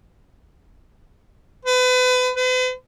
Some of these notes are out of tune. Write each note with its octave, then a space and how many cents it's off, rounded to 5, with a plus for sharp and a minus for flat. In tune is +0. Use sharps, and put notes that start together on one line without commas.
B4 +35
B4 +45